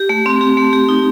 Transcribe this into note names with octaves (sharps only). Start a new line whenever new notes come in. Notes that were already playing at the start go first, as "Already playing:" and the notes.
Already playing: G4
A3
C4
G4
A3
G4
D#4